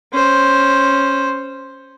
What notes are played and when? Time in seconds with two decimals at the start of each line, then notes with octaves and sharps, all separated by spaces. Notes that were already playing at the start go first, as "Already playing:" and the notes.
0.12 C#4 C5